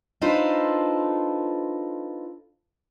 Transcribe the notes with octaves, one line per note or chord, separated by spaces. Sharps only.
D4 D#4 F4 A4 B4 C5